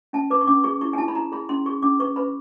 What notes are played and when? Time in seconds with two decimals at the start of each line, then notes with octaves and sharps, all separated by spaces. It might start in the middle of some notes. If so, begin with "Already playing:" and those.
0.13 C#4 A5
0.30 B4 D6
0.41 C#6
0.47 C#4 D6
0.64 G#4 C#6
0.81 E4 C#6
0.93 G#5
0.98 E4 A5
1.08 B5
1.15 E4 A#5
1.32 G#4 B5
1.49 C#4 C6
1.66 G#4 C#6
1.82 C#4 D6
1.99 B4 C#6
2.16 B4 B5